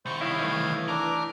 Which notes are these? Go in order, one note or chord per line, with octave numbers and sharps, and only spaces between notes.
C2 D#3 C5 C#6
E4 C#5 D#5 F5
E3 A3
D4 A#4 D6